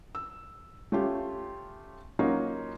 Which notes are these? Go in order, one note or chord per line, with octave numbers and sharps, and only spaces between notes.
E6
A3 C#4 F4 G4
F#3 A#3 C#4 D#4 F4 F#4